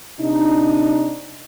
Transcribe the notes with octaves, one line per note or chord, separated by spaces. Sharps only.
C3 D4 D#4